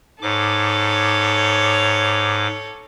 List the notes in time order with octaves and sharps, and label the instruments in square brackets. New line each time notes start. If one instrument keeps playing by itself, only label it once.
[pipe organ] G#2 D6 [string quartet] A4 C#5